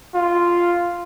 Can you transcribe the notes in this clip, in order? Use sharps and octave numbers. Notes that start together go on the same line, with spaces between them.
F4